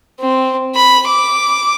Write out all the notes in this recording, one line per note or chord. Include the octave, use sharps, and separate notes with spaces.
C4
B5
D6